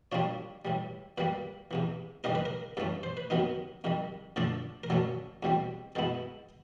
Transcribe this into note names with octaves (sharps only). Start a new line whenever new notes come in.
A#2 G3 A#3 D4 F4 C#5
A2 E3 G3
A#2 G3 A#3 B4
E2 C3 E3
C#3 E3 G3 A#3 D#4 A#4
B4
A#4
G2 E3 A3 C#4 A4
C5
B4
C3 D#3 F#3 B3 D#4 A#4
F2 C3 D#3 G3
D3 F3 A3 D4 F4 A4
A#4
A#2 F#3 A3 C#4 A4
E2 B2 G3 C4
B2 G#3 B3 E4 A4